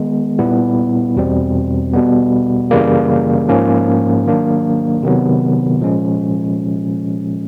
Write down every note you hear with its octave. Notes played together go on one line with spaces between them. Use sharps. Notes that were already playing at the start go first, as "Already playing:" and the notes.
Already playing: D#3 G#3 B3
A#2 G3 B3 E4
E2 B2 G3 C4
B2 G3 B3
F#2 C#3 E3 G3 A#3
G#2 F3 A#3 C#4
D#3 F#3 A#3 D4
C3 D#3 F#3 B3
A#2 F3 G#3 C#4